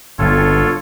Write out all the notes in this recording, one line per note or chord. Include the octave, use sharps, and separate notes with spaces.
G1 F4 A4 C#5